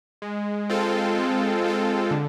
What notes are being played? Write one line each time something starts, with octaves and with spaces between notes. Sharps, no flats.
G#3
C4 F4 A4
G#3
C4 F4 A4
D3